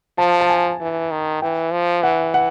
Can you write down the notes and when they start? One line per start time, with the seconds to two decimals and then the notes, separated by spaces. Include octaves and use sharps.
0.18 F3 A5
0.41 A5
0.50 G#5
0.81 E3
1.11 D#3
1.42 E3 G5
1.72 F3
2.03 E3 F#5
2.34 F#5